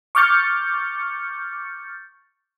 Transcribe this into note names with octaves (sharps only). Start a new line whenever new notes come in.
C#6 D6 F6 G6 A6 C#7